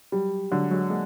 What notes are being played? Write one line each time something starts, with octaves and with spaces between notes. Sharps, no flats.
F#3 G3
D3 F#3 G#3
F#3 G#3
G#3 A#3